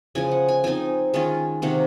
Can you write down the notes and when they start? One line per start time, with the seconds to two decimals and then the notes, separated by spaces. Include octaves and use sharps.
0.15 C#3 F3 G#3 G#5
0.31 F#5
0.48 G#5
0.64 F3 C4 D#4 G#5
1.14 D#3 G#3 C#4 F4
1.62 C3 D#3 A#3 F#5